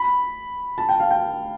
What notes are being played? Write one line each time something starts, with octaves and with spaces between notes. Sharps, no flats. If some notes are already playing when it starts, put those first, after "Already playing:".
Already playing: B5
A5
G5
F5
G5